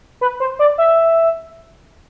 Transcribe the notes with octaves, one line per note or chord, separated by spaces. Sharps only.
B4
C5
D5
E5